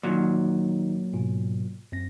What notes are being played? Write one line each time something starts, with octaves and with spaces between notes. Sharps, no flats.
A#2 D#3 F#3 D#4
G#2 B2 F4
F#2 C4 A#6